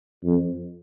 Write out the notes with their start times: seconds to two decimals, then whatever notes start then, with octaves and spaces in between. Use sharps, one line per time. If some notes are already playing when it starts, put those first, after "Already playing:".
0.24 F2